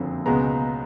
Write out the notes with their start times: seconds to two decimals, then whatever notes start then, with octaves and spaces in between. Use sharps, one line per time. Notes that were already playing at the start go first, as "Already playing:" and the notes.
Already playing: F#1 F2 D3 F3
0.25 C#2 B2 G#3 B3 A#5